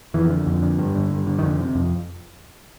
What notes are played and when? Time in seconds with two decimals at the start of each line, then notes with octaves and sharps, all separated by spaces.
0.14 F2 E3
0.30 D3
0.47 F2
0.62 D3
0.78 G2
0.95 D3
1.11 G2
1.27 D3
1.39 D#3
1.43 F2 D3
1.59 C3
1.75 F2